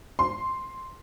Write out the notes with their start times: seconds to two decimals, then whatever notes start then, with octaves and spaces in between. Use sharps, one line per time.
0.19 C6